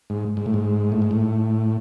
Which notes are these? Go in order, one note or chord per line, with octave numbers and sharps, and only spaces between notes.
G#2
G#2
A2
G#2
A2
G#2
A2